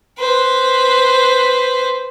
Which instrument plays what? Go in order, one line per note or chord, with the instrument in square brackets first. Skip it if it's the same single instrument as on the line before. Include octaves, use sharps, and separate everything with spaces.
[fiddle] B4 C5